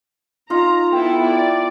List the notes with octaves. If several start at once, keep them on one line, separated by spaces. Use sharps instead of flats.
D#4 F4 A#5
B3 E4 A4 G5
D5